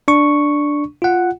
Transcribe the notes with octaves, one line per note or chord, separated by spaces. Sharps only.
D4 C#6
F4 F#5